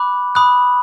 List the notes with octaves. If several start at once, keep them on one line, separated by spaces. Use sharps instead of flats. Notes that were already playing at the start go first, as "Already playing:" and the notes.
Already playing: B5 D6 F#6
B5 D#6 F#6